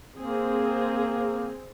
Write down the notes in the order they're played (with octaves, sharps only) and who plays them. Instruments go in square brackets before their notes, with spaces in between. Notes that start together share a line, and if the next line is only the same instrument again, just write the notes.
[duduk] A#3 [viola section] C4 G#4